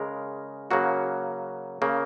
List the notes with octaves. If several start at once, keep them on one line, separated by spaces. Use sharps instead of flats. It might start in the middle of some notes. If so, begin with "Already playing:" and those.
Already playing: C#3 G#3 A#4
C#3 F#3 A#3 F#4
C#3 A#3